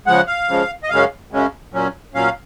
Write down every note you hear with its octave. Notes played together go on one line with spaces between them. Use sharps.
C#3 F3 G#3 F#5
F5
C#3 F3 G#3
D#5
F#2 C#3 G#3 C#4 F5
F#2 C#3 G#3 C#4
A#2 F#3 C#4
A#2 F#3 C#4 F5